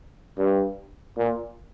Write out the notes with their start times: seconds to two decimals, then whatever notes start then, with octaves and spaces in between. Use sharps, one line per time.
0.38 G2
1.18 A#2